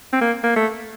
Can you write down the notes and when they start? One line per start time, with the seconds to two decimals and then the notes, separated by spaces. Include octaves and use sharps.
0.13 C4
0.21 A#3
0.44 A#3
0.56 A3